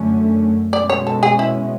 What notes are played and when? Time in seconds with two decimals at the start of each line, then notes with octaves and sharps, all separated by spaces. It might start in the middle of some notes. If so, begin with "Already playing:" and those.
Already playing: F#2 D3 A3 C#4
0.73 B2 G#3 C#4 D5
0.90 C#5
1.07 A4
1.23 G#4
1.39 E4